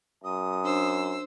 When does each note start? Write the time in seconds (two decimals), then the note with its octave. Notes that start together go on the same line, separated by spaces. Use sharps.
0.24 F#2 D#6
0.64 D4 C5 E6